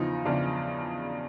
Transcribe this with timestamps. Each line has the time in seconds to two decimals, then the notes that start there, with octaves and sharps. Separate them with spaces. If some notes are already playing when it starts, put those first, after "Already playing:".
Already playing: E2 C#3 F3 D#4
0.25 E2 C#3 F3 D4